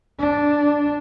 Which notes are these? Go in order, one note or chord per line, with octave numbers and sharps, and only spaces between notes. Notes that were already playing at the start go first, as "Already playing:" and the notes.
D4